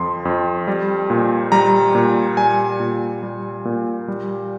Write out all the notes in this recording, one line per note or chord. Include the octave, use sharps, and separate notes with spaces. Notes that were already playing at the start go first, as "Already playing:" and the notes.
Already playing: F2 F3 C6
F2
G3
A#2
G3 A#5
A#2
G3 G#5
A#2
G3
A#2
G3